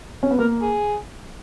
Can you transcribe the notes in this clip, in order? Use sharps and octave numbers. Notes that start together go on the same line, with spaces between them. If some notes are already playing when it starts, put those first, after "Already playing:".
C#4
B3
A#3 A#4
G#4